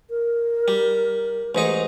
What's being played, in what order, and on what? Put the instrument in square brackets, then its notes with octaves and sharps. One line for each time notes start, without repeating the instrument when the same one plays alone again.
[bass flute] A#4
[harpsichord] G3
A1 G#2 D#4